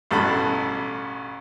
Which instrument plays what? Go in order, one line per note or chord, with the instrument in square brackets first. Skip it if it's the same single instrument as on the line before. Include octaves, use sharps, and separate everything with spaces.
[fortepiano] A1 G2 B2 A4 F#5 B5